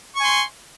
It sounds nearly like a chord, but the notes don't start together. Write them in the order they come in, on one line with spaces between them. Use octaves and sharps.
C#6 G#5 C6